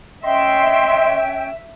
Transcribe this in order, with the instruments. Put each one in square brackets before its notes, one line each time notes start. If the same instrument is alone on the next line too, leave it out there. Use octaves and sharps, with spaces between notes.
[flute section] C#4 G5 [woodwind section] D#5 C6 [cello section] E5